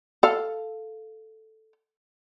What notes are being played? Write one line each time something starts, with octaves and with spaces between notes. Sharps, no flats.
A4 F5